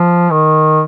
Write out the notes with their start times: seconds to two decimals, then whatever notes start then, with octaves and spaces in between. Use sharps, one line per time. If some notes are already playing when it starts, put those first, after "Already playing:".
Already playing: F3
0.31 D#3